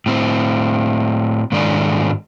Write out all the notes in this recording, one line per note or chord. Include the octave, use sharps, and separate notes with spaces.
A2 C4
G#2 D#3 G#3 D4 A4 D5